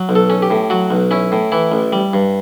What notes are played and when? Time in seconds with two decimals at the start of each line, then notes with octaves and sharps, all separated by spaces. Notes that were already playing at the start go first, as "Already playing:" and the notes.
Already playing: F#3
0.09 B1
0.15 A4
0.30 C#4
0.42 G4
0.50 A2
0.70 F#3 F#4
0.91 B1
1.11 C#4 E4
1.32 A2
1.52 E3 E4
1.72 A1
1.93 G3
2.14 G2